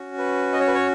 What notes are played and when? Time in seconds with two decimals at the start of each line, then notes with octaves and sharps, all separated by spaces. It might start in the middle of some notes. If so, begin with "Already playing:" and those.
Already playing: C#4 F#4
0.18 B4
0.53 D#5
0.60 C#5
0.68 B4
0.75 C#5